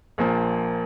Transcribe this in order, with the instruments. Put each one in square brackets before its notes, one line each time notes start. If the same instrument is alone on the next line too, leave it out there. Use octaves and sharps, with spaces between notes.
[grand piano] A#1 A#2 F3 A#3